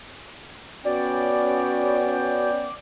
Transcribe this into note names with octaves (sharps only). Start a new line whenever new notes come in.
B3 C#4 F#4 D5 G5